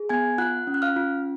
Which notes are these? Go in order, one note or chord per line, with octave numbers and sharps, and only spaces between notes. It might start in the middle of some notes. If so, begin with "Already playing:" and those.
Already playing: G#4
B3 G#5 G#6
F4 F#5 F#6
C#4
F#6
F5 F6
F4